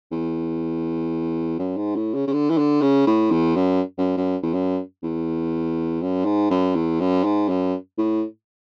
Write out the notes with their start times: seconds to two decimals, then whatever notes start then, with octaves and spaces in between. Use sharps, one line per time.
0.12 E2
1.59 F#2
1.77 G#2
1.96 A2
2.14 C#3
2.27 C#3
2.33 D3
2.50 E3
2.58 D3
2.82 C#3
3.07 A2
3.31 E2
3.56 F#2
3.98 F#2
4.17 F#2
4.42 E2
4.53 F#2
5.03 E2
6.02 F#2
6.25 G#2
6.50 F#2
6.75 E2
7.00 F#2
7.24 G#2
7.49 F#2
7.98 A2